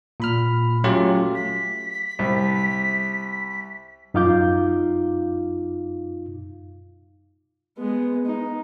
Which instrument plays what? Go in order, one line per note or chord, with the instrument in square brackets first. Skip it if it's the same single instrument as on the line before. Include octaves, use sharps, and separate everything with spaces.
[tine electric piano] A#2 B5 F6
F#3 A3 C#4 F4 G4
[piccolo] B6
[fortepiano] C2
[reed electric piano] F#2 D#4 F4 F5 D6 G6
[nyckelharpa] G#3 B3
D#4